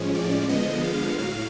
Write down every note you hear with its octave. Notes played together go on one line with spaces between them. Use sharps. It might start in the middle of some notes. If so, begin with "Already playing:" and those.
Already playing: A2 F3 G#3 C#4
D5
D3 F3 G#3 B3 D#5
F5
A2 F#3 F5